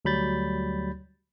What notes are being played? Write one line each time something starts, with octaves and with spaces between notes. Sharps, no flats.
D2 F#3 G3 B5 G6 A6